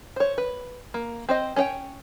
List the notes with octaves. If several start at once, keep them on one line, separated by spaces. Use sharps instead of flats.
C5 C#5
B4
A#3
C4 C5 D#5
C#4 D4 C#5 G5